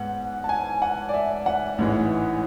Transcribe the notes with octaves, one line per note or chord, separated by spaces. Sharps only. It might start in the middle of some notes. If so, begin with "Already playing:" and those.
Already playing: G#2 B3 F#5
A5
G#5
F#5
D5
E5
F#5
A1 G#2 E3 G#3